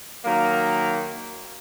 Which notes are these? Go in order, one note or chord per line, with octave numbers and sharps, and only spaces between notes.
D#3 F#3 A#3